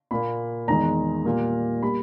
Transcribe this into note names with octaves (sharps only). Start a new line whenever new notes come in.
A#2 A#3 B5
E2 D#3 G#3 A#5
A#2 G3 A#3
G3 A#3 B5